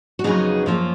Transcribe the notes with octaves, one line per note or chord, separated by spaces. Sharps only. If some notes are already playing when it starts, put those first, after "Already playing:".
F#4
F2 C#3 F#3 B3 D#4 G#4
F#2 F3 A#3 C#4